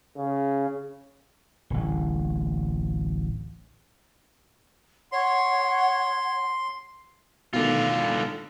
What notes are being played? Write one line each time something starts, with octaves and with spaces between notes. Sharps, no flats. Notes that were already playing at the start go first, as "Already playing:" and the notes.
C#3
D1 A1
C#5 F#5 C6
B2 D3 D#3 A3 F4